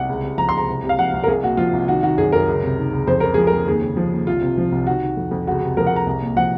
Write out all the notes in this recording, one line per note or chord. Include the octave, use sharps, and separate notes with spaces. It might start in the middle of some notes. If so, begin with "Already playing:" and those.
Already playing: C2 F#5
C#2
C3
F3 A#5
C6
C#2 A#5
C2
C3
F5
F3 F#5
C2
A#4
C2 G#4
A#2 F#4
F3 F4
C2
D#3 F#4
D#3 F#4
F#2 G#4
F#2 A#4
C#2
C3
D#3
C#2
F2 C5
C#3 A#4
F3 G#4
A#4
F2
D#2 G#4
C#3
F3
D#2
C2 F4
C3
F3
C2
D#3 F#4
D#3
F2
F2
C#2 F#4
C3
F3 A#4
F#5
C#2 A#5
C2
A#2
F3 F#5